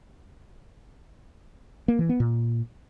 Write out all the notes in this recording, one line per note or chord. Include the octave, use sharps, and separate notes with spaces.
A#3
E3
B3
A#2